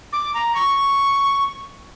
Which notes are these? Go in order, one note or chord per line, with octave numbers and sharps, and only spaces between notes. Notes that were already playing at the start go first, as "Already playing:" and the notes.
D6
A#5
C#6